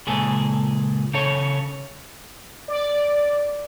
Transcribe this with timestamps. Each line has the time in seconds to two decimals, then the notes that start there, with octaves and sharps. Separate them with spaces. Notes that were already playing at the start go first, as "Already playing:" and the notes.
0.07 C#2 A#2 G#4 A4
1.14 C#3 A4 C#5
2.68 D5